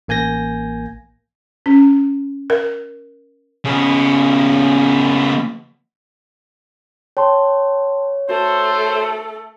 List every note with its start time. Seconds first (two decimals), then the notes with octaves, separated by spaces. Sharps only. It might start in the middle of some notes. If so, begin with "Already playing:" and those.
0.08 A1 A#3 G#5 G6 A#6
1.66 C#4
2.50 A#4
3.65 C#3 B3
7.17 C#5 G5 A5 C6
8.29 A3 F#4 A4 C5